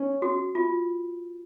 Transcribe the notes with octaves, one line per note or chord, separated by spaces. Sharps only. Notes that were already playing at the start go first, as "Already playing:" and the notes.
Already playing: C#4
F#4
F4